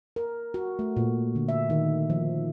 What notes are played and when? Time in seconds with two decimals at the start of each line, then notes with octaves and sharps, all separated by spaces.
0.16 A#4
0.54 F#4
0.79 A3
0.97 A#2
1.35 D3
1.49 E5
1.70 D#3
2.10 F3